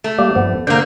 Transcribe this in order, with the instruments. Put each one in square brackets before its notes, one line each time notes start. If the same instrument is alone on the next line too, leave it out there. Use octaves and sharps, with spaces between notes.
[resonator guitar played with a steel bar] A3
[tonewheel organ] G3 A#3 G4
G2 F3 B3
[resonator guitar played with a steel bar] D3 A#3 [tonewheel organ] C5